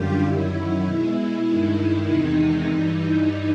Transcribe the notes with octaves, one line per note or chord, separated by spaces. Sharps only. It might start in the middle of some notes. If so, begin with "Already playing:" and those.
Already playing: F#2 D3 G3 F4 G4
F#2 D#3 F#3 E4
B2 G#3
G2 D#3 G#3
E2 C3 D#3 G#3 D#4
G2 E3 G3